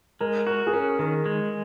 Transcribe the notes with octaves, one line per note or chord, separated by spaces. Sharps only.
G#3 A#4
F#4 A#4
G#4
C#4 A#4
D#3 A#4
G#3